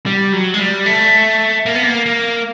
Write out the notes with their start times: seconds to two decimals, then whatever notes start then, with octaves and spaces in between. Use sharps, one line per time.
0.06 G3
0.33 F#3
0.54 G#3
0.59 G3
0.86 A3
1.66 A#3
1.75 B3
1.83 A#3
2.06 A#3